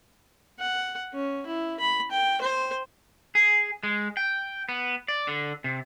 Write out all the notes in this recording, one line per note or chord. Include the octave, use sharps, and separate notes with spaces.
F#5
C#4
E4
B5
G5
C5
G#4
G#3
G5
B3
D5
D3
C3